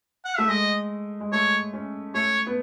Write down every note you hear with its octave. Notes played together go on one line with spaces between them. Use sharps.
F#5
A3 E5
G#3 D#5
G#3
A3 C#5
C#4
A3 C#5
B3